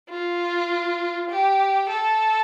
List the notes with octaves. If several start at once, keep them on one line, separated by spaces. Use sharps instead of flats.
F4
G4
A4